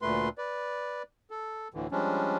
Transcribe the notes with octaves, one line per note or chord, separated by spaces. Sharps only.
D2 A#2 A3 B4 C6
B4 D5
A4
D2 A2 D3 E3
F3 G3 G#3 C#4 D4